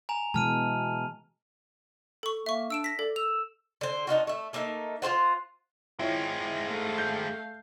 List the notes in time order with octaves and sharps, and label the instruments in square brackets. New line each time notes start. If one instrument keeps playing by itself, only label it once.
[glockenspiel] G#5 A#5 F7
[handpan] B2 E3 G#3 [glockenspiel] A5 F6 D#7
[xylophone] A4 C#6
[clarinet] A#3 [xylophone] E5 C#6
[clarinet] D4 [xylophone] E6 D7 E7
[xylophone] A#6 B6
[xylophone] A4 [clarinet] D5
[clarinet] E6 [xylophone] F7
[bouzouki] D3 C5
D4 D#4 F4 F#4
A3 E5
A3 A#3 D#4 E5
F4 G4 C5 F#5
[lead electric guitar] G#3 C4 [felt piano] E4 F4 C#5
[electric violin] A3 F5
[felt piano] G6